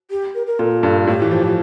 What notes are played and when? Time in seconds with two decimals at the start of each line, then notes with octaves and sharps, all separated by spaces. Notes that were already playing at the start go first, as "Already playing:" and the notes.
0.11 G4
0.35 A#4
0.47 A#4
0.59 A#2 A4
0.83 G2
1.07 A2 G4
1.22 E3
1.31 F3
1.44 F3